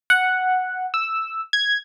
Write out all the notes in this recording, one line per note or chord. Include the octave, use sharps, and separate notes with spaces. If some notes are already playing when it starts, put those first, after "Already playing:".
F#5
E6
G#6